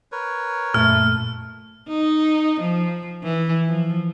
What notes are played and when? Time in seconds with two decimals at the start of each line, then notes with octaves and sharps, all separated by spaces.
0.12 A#4 B4 C#5
0.74 F#2 A#2 A3 F6
1.88 D#4
2.61 F3
3.24 E3
3.68 F3